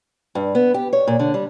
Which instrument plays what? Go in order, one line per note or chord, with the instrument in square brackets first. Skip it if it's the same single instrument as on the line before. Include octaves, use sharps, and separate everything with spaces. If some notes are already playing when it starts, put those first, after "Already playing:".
[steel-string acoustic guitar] G2
B3
G4
C#5
A#2
D3
G3